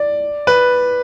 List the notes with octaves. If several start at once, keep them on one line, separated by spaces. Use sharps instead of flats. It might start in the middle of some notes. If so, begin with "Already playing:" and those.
Already playing: D5
B4